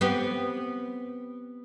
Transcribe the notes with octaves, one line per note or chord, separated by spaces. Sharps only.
B3 C4 G4